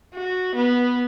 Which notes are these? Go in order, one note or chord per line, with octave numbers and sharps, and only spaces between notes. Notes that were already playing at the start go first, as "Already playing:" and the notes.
F#4
B3